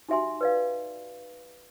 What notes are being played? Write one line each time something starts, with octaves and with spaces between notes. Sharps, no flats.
D#4 F#4 G4 E5 G#5 C6
B4 D5 F5